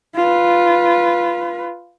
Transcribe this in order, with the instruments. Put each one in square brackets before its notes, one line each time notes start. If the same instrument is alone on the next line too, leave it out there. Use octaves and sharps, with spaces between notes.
[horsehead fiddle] F4 B4